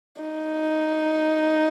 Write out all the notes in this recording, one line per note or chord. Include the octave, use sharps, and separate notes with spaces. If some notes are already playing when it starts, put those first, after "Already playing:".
D#4